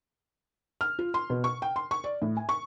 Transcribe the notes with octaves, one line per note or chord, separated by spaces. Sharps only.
F6
F4
C6
B2
C#6
G5
C6
C#6
D5
A2
G#5
C#6